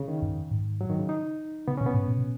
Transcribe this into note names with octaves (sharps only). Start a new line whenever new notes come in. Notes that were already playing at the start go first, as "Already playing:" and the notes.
Already playing: C#3
D#3
F#2
G#2
F#3
D#3
C#3
D#4
C#3 B3
C#4
B2
B3
G#2
B2
B2